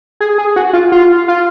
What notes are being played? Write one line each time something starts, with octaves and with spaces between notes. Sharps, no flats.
G#4
G#4
F#4
F4
F4
F4